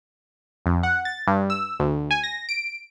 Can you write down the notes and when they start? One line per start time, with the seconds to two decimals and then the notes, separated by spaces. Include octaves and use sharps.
0.66 F2
0.83 F#5
1.05 A6
1.27 G2
1.50 E6
1.80 D2
2.11 G#5
2.23 A#6
2.49 D7